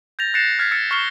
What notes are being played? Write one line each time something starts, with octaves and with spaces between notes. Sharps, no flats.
G6 A6 A#6 F7
F#6 A6 A#6 C7 C#7 E7
F6 G#6 A6 B6
E6 A6 C#7
C#6 F6 C7 C#7 G7